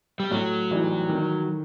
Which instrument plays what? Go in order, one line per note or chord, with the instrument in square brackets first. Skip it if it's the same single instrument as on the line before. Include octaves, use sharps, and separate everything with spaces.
[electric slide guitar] G3
[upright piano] A2 [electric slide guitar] F#3
[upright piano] E3 G3 D#4
D#3